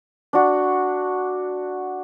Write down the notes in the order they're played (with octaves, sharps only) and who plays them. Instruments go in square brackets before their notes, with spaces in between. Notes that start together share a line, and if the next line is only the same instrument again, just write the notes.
[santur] D4 F#4